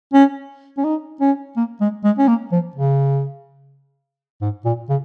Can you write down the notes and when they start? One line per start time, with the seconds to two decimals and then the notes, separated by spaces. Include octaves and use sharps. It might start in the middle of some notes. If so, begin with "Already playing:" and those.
0.13 C#4
0.78 C#4
0.84 D#4
1.21 C#4
1.56 A#3
1.81 G#3
2.04 G#3
2.18 C#4
2.28 A#3
2.52 F3
2.76 C#3
4.41 G#2
4.65 A#2
4.89 C#3